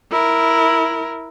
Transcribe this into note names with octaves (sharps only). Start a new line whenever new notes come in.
E4 A#4